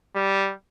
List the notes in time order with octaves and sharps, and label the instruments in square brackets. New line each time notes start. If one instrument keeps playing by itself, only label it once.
[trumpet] G3